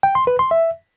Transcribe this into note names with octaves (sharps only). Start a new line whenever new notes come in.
G5
C6
B4
C6
E5